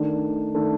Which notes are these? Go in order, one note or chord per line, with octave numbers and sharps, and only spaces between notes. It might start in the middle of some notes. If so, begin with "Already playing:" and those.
Already playing: D#3 A3 D4
D#3 A3 D4